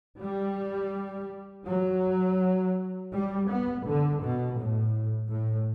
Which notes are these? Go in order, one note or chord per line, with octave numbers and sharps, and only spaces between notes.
G3
F#3
G3
B3
D3
B2
A2
A2